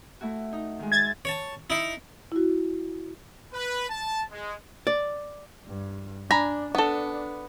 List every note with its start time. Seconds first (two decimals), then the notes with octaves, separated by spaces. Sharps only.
0.21 A3 E4 F#4
0.53 D#4
0.79 D#3 G#3
0.92 E5 G#6 A6
1.25 C#5 A5
1.70 D#4 E4
2.32 E4 F#4
3.54 B4
3.89 A5
4.31 G#3
4.87 D5
5.66 G2
6.31 D4 G#5 A#5 B5
6.75 B3 D4 A4